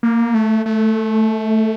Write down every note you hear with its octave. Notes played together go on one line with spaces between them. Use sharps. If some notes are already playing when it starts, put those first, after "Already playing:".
A#3
A3
A3